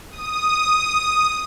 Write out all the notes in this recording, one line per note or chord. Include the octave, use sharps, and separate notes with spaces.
D#6